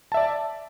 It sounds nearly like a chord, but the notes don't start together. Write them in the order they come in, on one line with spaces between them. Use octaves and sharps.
A5 E5 D5